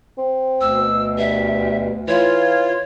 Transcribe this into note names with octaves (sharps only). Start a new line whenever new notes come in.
C4
D2 B2 E6
G2 E5
E3 F4 C#5